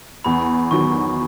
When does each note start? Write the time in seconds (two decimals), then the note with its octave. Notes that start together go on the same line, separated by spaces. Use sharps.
0.25 E2 B5
0.71 D#3 F#3 C#6